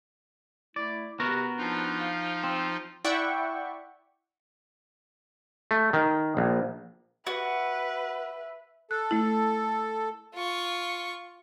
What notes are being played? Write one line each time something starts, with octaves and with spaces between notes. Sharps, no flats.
A3 E4 D5
C3 B3 F#4 A#4
F3 C4 D4 D#4 F4
F5
C4
E4 D5 E5 F#5 G5 C#6
A3
D#3
A#1
F#4 B4 E5
A4 F#6
A3 E4
F4 C#6